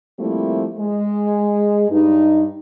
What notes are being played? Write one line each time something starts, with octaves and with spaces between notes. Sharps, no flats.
F3 G3 A3 A#3 C4 E4
G#3
G2 D#4